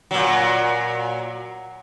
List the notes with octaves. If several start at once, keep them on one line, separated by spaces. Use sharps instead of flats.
A#2 F#3